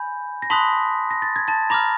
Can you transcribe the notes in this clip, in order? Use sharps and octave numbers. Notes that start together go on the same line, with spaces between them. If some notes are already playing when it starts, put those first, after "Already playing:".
Already playing: G#5 B5 G6
A#6
A5 B5 C6 D#6 F#6 B6
A#6
A6
G#6
A5 A6
A#5 B5 D6 F6 A#6